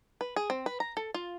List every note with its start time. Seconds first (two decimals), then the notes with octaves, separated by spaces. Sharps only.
0.21 B4
0.36 G#4
0.50 C4
0.66 B4
0.80 A#5
0.97 A4
1.14 F4